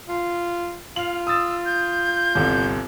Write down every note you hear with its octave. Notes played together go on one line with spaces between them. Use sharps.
F4
F4 F5 F#7
D#6 E6 A6
G6
G1 C2